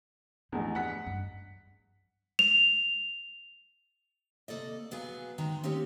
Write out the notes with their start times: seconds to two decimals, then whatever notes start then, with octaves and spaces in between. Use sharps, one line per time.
0.52 A1 E2 F3
0.75 F#5 B6
1.06 G2
2.39 F7
4.48 C3 A#3 A4 D5 D#5
4.91 B2 F#3 B3 G#4 F5 G#5
5.38 G#2 D#3 G#3 G5 A#5
5.64 A#3 C4 C#4 D#4 G4 C#5